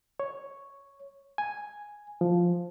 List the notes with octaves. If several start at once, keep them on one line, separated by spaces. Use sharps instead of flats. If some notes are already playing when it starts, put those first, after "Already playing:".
C#5
G#5
F3